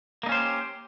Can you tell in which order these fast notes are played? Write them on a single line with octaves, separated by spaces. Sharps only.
A#3 D#4 C#4 C5 G4